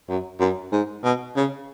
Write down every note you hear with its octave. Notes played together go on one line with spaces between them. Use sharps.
F#2
F#2
G#2
B2
C#3